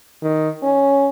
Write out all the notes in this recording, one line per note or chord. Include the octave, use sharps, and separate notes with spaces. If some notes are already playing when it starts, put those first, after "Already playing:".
D#3
C#4